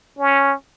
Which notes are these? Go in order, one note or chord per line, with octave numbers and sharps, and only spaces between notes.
C#4